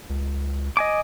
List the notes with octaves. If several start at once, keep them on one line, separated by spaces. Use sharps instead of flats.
C#2
D#5 G#5 D6